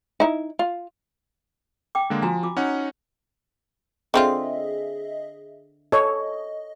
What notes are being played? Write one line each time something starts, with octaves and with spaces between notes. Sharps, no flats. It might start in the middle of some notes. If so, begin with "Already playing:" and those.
D#4 E4
F4
G5 D6
D3 G#3 A#3
F3 F#4 G#5 A#5
F4 D6
C#4 D#4 F#5
D3 C4 F4 G#4 D#5 E5
A4 C#5 D#5